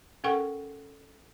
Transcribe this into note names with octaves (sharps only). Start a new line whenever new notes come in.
C#4 A4 A#4 F#5 G5 C#6